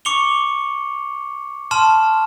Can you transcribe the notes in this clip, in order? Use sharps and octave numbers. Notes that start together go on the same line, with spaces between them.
C#6 D6 C#7 F7 G7
A5 C6 F6 E7